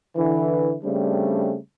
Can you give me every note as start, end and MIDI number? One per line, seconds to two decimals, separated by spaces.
0.16 0.75 50
0.16 0.75 52
0.83 1.56 49
0.83 1.56 55
0.83 1.56 57
0.83 1.56 60
0.83 1.56 62